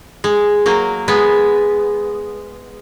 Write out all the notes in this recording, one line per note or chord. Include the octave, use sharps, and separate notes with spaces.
G#3
F#3 A#3
G#3 B3